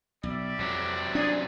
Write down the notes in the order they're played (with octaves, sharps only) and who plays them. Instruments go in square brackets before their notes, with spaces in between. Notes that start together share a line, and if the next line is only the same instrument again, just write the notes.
[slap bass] B1 [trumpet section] G3 D5 E5
[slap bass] F2 [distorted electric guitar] C3 F#3
[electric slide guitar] C#4 D5 [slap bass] D4 [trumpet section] G#4